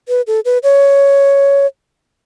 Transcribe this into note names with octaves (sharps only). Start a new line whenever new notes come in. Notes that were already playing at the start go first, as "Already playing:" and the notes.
B4
A4
B4
C#5